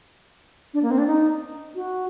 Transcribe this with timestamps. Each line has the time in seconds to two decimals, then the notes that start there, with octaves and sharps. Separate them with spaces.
0.74 D4
0.83 A#3
0.91 C4
0.98 D4
1.07 D#4
1.75 F#4